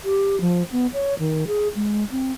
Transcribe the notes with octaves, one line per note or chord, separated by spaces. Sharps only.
G4
F3
B3
C#5
D#3
G#4
G#3
C4